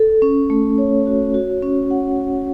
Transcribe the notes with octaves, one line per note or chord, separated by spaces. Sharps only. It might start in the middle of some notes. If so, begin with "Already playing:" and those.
Already playing: A4
C#4
A3
C#5
F#4
F#4
C#4
F#5